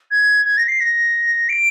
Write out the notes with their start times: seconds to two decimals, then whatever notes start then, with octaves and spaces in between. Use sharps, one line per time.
0.11 G#6
0.45 G#6
0.57 A#6
0.68 C7
0.80 A#6
1.49 D7